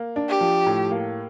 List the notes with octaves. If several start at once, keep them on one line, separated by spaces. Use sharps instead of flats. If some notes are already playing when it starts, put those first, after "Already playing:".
Already playing: A#3
D4
G4
F3
A2
A#3